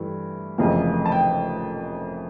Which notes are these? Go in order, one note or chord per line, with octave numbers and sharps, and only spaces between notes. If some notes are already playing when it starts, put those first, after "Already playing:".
Already playing: G2 E3 A3
F1 F2 C#3 E3 A#3
A5
G5